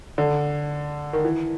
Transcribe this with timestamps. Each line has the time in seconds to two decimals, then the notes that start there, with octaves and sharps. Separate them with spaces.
0.18 D3
1.13 D#3
1.24 E3